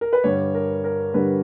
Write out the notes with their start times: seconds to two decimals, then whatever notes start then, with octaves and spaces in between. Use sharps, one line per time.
0.01 A#4
0.13 B4
0.24 G2 D3 G3 C#5
0.54 A#4
0.84 A#4
1.14 G2 D3 G3 B4